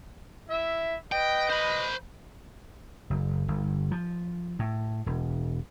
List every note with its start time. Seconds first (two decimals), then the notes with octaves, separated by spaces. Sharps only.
0.49 E4 E5
1.12 B4 D#5 G5
1.50 C5 B5
3.10 F#1
3.48 G1
3.91 F3
4.59 A2
5.06 E1